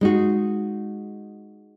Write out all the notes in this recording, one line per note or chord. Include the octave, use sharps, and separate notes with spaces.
G#3 D#4 F#4